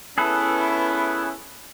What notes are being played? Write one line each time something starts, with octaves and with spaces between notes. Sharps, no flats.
B3 C#4 E4 G#4 A4 B4